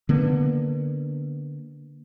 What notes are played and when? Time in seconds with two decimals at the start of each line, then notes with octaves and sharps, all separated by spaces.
0.09 D3 A#3 B3